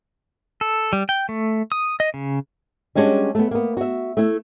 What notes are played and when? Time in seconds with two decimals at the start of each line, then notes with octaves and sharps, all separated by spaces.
0.61 A4
0.93 G3
1.09 G5
1.29 A3
1.72 D#6
2.00 D#5
2.14 C#3
2.95 G3 G#3 C#4 D4 F4 F#4
3.35 A3 B3
3.51 A#3 B3
3.77 F#4 E5
4.17 A3 E4